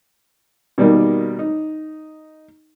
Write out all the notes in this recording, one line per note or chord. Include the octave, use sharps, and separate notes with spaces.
B2 D#3 G3 A#3 D#4 G4
D#4